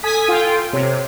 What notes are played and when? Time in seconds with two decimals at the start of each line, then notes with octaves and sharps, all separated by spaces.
0.03 A4 G#5 D#6 B6
0.28 F4 G5
0.73 C3 C#5